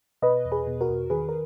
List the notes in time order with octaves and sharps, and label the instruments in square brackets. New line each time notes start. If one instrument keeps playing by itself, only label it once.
[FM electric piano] B2 B4 D#5
E2
G#4 B4
B2
F#4 A#4
E2
D#3 G#4 B4
A#4